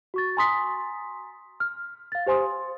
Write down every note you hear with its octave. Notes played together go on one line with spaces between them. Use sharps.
F#4 C#6 A6
G#5 A#5 C6 D#6 B6
F6
F5 A6
G4 C5 G#5 C6 D#6
C6